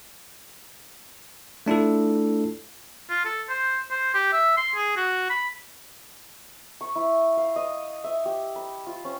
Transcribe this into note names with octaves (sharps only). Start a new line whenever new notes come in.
A3 D4 E4 F4 A4
F4
A4
C5
C5
G4
E5
C6
G#4
F#4
B5
C#6
E4
F5
D#5
E5
G4
B5
F4
C#4